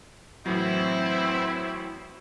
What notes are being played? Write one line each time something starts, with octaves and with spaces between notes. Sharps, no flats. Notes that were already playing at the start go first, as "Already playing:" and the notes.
A2 E3 F#3 C4 E4